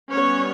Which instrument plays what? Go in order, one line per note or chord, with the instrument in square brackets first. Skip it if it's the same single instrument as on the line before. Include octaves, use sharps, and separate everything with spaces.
[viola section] G3 B3 C#4 C#5